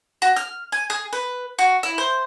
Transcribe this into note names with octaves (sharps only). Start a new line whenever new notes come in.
F#4
F6
G#5
G#4
B4
F#4
E4
C5